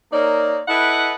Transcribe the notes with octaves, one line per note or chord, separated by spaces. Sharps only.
A#3 D#4 A#4 C#5 D5
E4 A4 B4 D#5 F#5